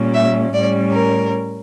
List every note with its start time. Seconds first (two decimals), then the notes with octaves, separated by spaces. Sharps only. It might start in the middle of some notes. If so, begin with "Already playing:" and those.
Already playing: A#2 G3 C#4
0.14 E5
0.53 A2 G3 C#4 D5
0.93 A#4